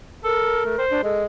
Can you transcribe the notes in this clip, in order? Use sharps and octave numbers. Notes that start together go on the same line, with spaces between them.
A4 A#4
A3
C5
D4
G#3 A4